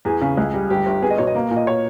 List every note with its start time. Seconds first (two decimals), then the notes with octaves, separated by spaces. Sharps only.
0.05 E2 G#4
0.21 C#3
0.37 C#2
0.54 G3
0.70 G1 G4
0.86 G1
1.02 B3 G#4
1.10 D#5
1.18 B2 C#5
1.27 D#5
1.35 A#3
1.51 A#2
1.56 D#5
1.67 C#5